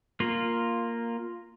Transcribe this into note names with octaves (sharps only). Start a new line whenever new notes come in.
A#3 F4